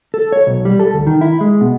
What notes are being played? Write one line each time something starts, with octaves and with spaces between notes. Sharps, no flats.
A4
C#5
B1
G3
A4
D2
D#3
E4
G#3
B2